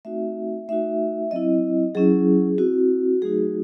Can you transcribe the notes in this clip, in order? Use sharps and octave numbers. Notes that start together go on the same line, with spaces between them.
A3 C4 D#4 F#4 E5
A3 D#4 F#4 E5
F#3 C4 E4 D#5
F#3 C#4 E4 G#4
C4 E4 F#4
F#3 A3 D#4 F#4 G#4